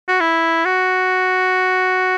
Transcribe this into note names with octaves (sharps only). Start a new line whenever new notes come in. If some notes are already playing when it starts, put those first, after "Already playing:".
F#4
E4
F#4